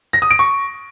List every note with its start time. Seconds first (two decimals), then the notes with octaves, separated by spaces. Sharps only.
0.13 A#6
0.22 D#6
0.31 D7
0.39 C#6